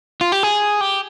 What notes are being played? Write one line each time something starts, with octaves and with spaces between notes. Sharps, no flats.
F4
G4
G#4
G4